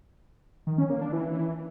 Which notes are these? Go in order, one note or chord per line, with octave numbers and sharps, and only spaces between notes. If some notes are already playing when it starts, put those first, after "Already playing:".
D#3
C#4
A#3
D4
E3